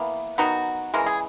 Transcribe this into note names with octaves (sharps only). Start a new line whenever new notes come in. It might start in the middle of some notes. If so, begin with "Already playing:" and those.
Already playing: E3 A#3 B3
D#3 F#3 B3 D#4 F#4
C#3 E3 G#3 A#4
G#4